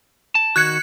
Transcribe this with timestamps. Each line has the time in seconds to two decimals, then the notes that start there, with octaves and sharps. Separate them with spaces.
0.35 A5
0.56 D#3 F#4 F#6 G#6 C#7